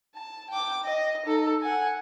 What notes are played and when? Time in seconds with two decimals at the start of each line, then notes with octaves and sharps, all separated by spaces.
0.15 A5
0.51 G5 D6
0.85 D#5
1.26 D#4 A4
1.62 F#5 G#5